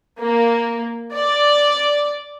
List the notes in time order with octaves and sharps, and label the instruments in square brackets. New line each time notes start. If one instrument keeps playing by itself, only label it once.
[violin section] A#3
D5